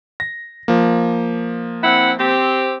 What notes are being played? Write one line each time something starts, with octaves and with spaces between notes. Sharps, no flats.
A#6
F3 A#3
C4 E4 F#5
C4 G4